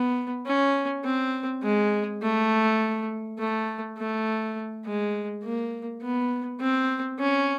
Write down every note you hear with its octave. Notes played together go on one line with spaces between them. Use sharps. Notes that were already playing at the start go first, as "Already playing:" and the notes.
Already playing: B3
C#4
C4
G#3
A3
A3
A3
G#3
A#3
B3
C4
C#4